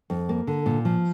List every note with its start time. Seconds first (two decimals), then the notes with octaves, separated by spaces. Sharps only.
0.10 F2
0.29 A#3
0.47 D3
0.66 A#2
0.85 F3